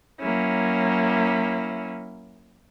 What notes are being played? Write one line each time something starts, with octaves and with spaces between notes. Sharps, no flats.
F#3 A#3 C#4 E4